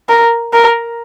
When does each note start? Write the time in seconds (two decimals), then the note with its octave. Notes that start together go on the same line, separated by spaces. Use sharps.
0.09 A#4
0.53 A#4